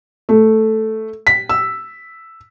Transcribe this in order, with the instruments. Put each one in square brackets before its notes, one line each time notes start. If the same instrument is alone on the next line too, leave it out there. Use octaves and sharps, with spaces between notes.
[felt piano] A3
B6
E6